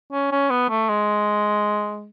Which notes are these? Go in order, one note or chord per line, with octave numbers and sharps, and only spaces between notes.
C#4
C#4
B3
A3
G#3